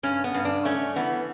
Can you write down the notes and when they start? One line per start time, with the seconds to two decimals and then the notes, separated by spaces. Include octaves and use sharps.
0.03 G2 C#4
0.24 B3
0.34 G2
0.45 D4
0.65 A3 C#4
0.96 E3 B3